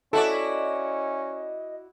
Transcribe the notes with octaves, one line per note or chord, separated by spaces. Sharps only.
C#4 E4 F#4 A4 D5 D#5